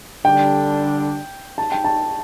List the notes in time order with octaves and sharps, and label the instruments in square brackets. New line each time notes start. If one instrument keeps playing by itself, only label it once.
[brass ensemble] D3 G3 D4 [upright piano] G5
[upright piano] A5
G5
A5